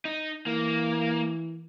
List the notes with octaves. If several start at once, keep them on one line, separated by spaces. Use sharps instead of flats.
D#4
E3 A#3